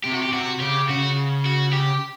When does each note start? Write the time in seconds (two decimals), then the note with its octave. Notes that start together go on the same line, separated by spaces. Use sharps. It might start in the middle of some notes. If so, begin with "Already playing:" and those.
0.04 C3 G4
0.14 F#4
0.23 G4
0.33 C3 F#4
0.60 C#3 G4
0.89 C#3 F#4
1.46 F#4
1.73 G4